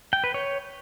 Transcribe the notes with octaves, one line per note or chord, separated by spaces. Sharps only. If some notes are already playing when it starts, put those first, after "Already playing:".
G5
B4
C#5